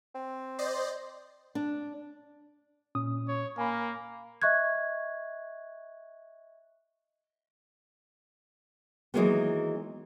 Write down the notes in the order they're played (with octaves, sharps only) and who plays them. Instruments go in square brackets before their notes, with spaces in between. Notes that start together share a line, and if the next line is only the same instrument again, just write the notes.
[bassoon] C4
[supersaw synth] C5 D5 D#5
[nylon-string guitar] D4
[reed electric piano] A#2 C#4 D#6
[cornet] C#5
[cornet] A#3 [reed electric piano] G#5 B5
[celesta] D#5 E5 C#6 F#6 G#6
[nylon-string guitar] D#3 E3 F#3 G#3 A#3 B3